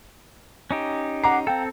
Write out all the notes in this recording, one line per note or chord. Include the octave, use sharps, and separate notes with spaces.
C#4 D#4 G4
F#5 A#5 D6 C7
C4 A4 F5 G5